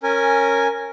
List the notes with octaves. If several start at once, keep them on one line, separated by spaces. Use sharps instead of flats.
C#4 A#4 G#5